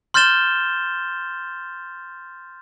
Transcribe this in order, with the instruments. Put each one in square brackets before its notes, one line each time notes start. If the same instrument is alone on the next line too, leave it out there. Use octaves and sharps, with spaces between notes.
[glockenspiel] C6 F6 G6 A6 E7 G7